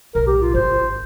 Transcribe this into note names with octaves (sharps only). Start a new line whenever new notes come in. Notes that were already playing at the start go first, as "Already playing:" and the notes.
B1 A2 A#4
G4
F4
G#1 C5